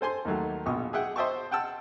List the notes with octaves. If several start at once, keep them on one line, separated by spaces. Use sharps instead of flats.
A4 C5 G#5 C6
D#2 D#3 F#3 A3
A#1 B2 C#6 D#6
G#4 E5 F#5 G5
C5 D#5 E5 G5 A5 C#6
F#5 G5 A5 E6